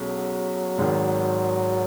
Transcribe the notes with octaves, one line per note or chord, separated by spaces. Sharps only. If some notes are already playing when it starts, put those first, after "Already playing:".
Already playing: B1 B2 F#3 G#3 C#4
G#1 G#2 D#3